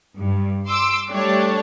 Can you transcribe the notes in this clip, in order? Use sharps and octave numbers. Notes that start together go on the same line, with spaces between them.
G2
C6 D6 E6
G3 A3 D4 G4 C#5